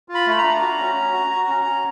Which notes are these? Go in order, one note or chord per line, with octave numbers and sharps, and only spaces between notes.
F4
B5
A3 B5
A#5
D4
F#4
C#4
C#4
F#4
F#4
C#4
C#4